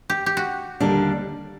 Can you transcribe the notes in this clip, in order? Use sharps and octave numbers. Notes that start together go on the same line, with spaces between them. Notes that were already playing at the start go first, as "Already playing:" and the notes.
G4
G4
F#4
D#2 D3 G3 A#3 D4